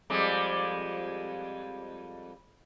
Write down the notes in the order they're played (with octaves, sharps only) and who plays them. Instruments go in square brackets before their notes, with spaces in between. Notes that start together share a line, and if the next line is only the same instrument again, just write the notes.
[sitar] F2 G3 G#3